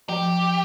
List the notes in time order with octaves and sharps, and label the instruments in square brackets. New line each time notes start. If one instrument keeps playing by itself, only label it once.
[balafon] F3 [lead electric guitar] G4